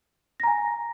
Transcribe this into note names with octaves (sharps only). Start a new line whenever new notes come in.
G#5 A#5 A#6